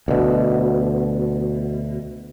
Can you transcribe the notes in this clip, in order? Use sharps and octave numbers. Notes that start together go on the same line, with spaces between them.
D2 B2